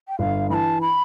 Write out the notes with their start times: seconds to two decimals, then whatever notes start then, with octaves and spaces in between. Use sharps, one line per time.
0.08 G5
0.19 G1 F5
0.50 E3 A5 B5
0.81 B5